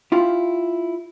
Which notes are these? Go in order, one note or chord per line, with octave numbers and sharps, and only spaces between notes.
E4 F4 G4 F5